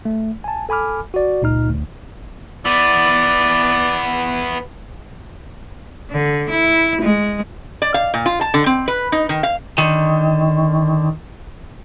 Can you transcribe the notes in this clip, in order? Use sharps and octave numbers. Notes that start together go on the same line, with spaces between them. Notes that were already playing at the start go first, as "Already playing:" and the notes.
A3
G#5 A5
A4 G#5 B5 D6 F6
F#4 D5
C#2 A#2 D#4 F6
D2
E3 B3 D5
D3
E4
G#3
D5
F5
A#2
F4
A5
D3
C4
B4
D#4
D#3
F5
D3 D#3